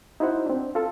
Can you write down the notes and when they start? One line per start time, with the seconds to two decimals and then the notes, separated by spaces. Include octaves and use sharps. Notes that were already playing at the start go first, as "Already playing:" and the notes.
0.20 D#4 E4 F#4 C5 F#5
0.46 C4 D4
0.75 F4 A4